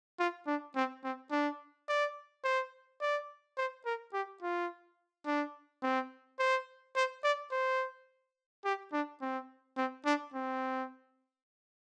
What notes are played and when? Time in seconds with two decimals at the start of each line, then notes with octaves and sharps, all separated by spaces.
0.20 F4
0.47 D4
0.76 C4
1.04 C4
1.31 D4
1.89 D5
2.45 C5
3.01 D5
3.58 C5
3.86 A#4
4.14 G4
4.43 F4
5.26 D4
5.83 C4
6.39 C5
6.96 C5
7.24 D5
7.52 C5
8.65 G4
8.93 D4
9.21 C4
9.77 C4
10.06 D4
10.34 C4